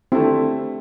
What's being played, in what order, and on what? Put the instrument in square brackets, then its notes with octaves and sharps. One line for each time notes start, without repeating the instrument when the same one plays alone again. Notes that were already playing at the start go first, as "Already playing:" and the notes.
[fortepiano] D3 A3 E4 [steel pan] C4